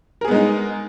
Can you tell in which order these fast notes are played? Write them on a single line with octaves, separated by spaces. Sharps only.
A#4 G#4 B3 G#3 D#4